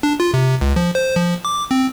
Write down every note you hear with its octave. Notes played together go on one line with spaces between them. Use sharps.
D4
F4
C3
C#2
F3
C5
F3
D6
C4